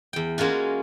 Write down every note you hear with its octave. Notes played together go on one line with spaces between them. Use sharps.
E2 G5
G#3 A#3 C#4 F4 F#4